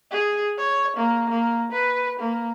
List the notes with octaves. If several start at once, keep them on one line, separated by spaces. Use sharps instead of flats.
G#4
C#5
A#3
A#3
B4
A#3